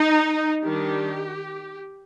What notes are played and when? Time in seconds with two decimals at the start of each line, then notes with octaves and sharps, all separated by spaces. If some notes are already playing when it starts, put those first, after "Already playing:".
Already playing: D#4
0.64 D#3 G3 D4 G4